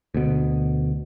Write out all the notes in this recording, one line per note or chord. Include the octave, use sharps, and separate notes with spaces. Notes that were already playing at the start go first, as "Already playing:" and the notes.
D2 B2